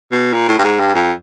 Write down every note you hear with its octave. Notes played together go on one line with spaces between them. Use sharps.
B2
A#2
A2
G2
G#2
G2
F2